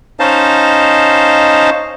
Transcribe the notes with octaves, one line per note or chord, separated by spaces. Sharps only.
C#4 D#4 C5 D#5 F5 A5